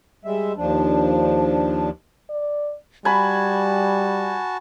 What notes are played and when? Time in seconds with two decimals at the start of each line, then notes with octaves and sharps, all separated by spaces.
0.25 G3 G#3 E5
0.57 D#2 F3 D4
2.29 D5
3.05 G3 F#4 G#5 A5 B5